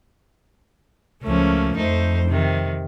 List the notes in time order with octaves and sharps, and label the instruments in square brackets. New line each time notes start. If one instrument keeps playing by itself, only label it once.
[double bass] C#2 F3 [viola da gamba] A3 A#3 C#4
[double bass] F2 [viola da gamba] A3 D#4 C5
[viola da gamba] C3 D#3